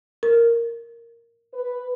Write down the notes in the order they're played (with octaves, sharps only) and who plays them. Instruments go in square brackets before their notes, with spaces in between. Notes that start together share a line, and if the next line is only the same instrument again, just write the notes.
[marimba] A#4
[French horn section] B4